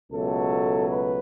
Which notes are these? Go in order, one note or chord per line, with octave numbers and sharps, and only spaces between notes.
C#2 B2 F#3 A3 A4
B4